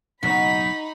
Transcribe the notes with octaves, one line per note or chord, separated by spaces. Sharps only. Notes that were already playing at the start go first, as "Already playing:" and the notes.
F#1 B1 A2 D#4 F#4 B5 B6